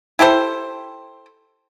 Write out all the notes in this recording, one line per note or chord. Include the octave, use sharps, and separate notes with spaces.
E4 G4 A4 C5